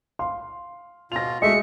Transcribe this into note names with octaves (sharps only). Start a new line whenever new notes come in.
F5 C6
B2 F4 A#6 F7
G#3 A3 F#4 D#5 E5 C#7